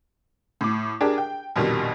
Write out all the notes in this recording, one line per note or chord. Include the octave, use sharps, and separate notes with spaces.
A2 D6
D4 G4 G#4 A#4
G5
A#1 F2 B2 D#3 G3